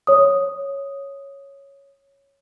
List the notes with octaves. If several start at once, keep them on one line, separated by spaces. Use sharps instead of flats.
C#5 D#6